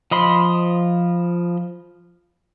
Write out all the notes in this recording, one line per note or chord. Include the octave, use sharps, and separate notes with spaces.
F3 D#5 B5 C6